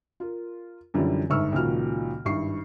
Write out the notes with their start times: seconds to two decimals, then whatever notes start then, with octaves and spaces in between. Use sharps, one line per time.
0.20 F4 A#4
0.94 F#2 D3 E3 F3 G3
1.30 G1 G#2 E5 C#6 E6 F6
1.52 C#2 A#2 D#3 F3 F#4 F6
2.25 G#1 G2 E4 C#6 C7